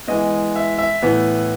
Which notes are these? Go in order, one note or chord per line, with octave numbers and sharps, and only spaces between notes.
E3 G#3 B3 D#5
E5
E5
A2 E3 B3